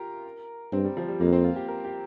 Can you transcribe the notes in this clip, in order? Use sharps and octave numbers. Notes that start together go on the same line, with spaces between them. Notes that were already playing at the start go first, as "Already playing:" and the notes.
Already playing: F4 G4 A#4
G2 C4
G3
F3
G3
F2 A#3
C4
F4
G4
A#4
G4